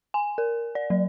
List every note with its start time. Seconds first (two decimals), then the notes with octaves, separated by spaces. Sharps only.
0.14 G#5
0.38 A#4
0.75 D5
0.90 F#3